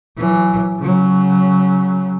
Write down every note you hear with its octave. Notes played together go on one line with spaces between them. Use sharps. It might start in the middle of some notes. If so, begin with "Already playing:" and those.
E3 F#3
C#3 F#3